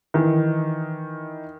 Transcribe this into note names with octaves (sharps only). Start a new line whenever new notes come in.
D#3 E3 D#4